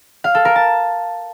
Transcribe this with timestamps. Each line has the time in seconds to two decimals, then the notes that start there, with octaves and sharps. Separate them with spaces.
0.24 F5
0.35 A4
0.45 A#4
0.56 A5